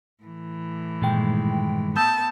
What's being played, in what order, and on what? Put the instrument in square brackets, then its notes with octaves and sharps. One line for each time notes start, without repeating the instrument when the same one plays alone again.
[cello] A2 E3
[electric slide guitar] G2 D#3 G#3 [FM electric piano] A#2 G5
[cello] B3 [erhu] A5 [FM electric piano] D#6 E6 G6